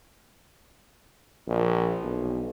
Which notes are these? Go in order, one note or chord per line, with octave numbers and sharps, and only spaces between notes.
A#1
B1